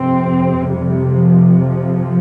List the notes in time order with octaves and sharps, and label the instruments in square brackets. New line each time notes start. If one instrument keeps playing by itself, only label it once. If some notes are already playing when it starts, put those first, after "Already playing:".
Already playing: [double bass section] F2 C3 C4
G3
F3
F3